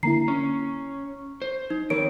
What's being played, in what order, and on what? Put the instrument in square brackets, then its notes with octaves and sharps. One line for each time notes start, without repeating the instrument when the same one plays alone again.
[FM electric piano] D3 A#3 E4 [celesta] A#5 C7
[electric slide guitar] C#4 [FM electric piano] C#6
[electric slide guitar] C5
[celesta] D#4
[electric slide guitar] D#3 G3 C4 [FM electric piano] A#4 C#5 [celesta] D7